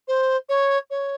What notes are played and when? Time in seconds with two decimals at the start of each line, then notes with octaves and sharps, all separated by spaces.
0.08 C5
0.49 C#5
0.90 C#5